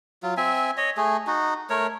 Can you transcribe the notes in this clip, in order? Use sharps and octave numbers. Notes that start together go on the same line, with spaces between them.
F#3 F4
C4 E5 G#5
C#5 D#5
A3 G#4
D#4 F#4
A3 A#4 C#5